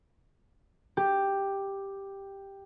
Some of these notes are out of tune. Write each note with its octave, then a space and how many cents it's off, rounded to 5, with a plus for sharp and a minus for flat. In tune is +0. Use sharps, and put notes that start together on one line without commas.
G4 +5